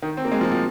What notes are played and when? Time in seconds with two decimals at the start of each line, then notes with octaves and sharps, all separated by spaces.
0.02 D#3
0.17 C4
0.25 A#3
0.32 G#3
0.41 F3
0.52 F3